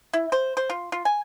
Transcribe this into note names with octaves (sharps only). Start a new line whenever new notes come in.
E4
C5
C5
F4
F4
G#5